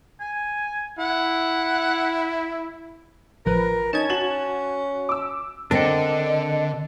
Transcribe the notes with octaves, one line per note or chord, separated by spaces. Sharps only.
G#5
E4 F#5
A1 F3 A#4 B4
C#4 D#4 A5 G#6
F#4 E7 F#7
D6 E6
D3 C4 D4 A4 A#4 D#5